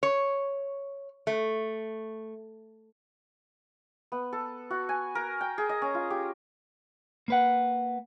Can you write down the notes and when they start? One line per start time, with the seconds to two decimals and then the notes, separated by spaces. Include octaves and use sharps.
0.03 C#5
1.27 A3
4.12 B3
4.33 A4
4.70 F#4
4.89 G#5
5.15 A#4
5.41 G5
5.58 G#4
5.69 D#5
5.82 C#4
5.94 F4
6.10 G4
7.28 A#3 B4 F#5